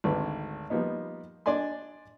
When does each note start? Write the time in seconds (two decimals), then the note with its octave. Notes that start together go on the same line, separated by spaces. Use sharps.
0.04 G#1 D2 B4
0.70 F3 G3 A#3 B3 D#4
1.46 D4 D5 D#5 G#5 C6